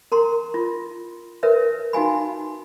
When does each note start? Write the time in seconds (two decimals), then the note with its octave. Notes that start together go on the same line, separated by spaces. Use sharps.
0.12 A#4 A#5 C6
0.54 F4
1.43 A#4 B4 C#5 E5
1.93 D#4 F#4 F5 G#5 B5